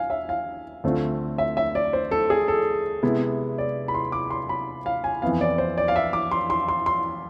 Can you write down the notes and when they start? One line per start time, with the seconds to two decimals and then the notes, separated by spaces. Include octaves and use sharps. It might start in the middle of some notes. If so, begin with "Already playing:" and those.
Already playing: F5 G#5
0.10 E5
0.29 F5
0.84 D2 D3 A3 C4 F4
1.38 E5
1.57 E5
1.75 D5
1.93 C5
2.11 A4
2.30 G#4
2.48 A4
3.03 C3 G#3 B3 E4
3.58 D5
3.88 B5
3.94 C6
4.12 D6
4.31 C6
4.49 B5
4.86 F5
5.04 G#5
5.22 F2 E3 B3 F5
5.41 D5
5.58 C5
5.78 D5
5.88 F5
5.96 E5
6.13 D6
6.31 C6
6.50 C6
6.68 C6
6.86 C6